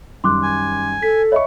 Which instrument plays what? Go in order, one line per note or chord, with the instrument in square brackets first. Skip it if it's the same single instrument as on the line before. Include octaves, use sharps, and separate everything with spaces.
[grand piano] F#2 D#3 G3 [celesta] C6 D6 F#6
[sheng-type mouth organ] G#5
[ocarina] A4 [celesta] B6
[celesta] C#5 D#5 E5 [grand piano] B5 C#6